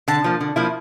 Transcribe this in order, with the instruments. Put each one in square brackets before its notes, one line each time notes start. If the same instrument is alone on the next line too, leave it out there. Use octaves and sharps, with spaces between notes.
[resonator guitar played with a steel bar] D3 [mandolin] A5
[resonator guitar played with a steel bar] F3 A#3
D3
F3 A#3 E4